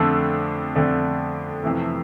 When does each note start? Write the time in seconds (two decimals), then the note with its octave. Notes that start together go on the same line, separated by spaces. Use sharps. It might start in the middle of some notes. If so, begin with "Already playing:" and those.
Already playing: F2 D3 A3 D4 E6
0.75 F2 D3 A3 D4
1.63 F2 C3 E3 A3